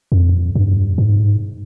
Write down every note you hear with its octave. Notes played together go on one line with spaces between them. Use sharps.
F2
G2
G#2